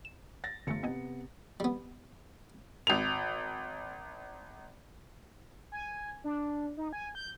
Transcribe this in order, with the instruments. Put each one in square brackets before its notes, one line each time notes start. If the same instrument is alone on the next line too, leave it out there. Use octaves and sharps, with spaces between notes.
[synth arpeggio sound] E7
[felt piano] A6 A#6
[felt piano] G1 C#7 [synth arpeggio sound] D3 E3 A3
[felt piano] C3 B3 [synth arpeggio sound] C4 D#5 G#5
[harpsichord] G3 B3
[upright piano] G#1 F7
[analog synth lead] G#5
D4
D#4
G#5
G6